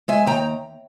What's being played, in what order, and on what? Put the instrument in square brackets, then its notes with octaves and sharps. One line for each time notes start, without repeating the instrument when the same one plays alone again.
[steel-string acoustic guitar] G#3 E5 G#5
D#2 G5 A#5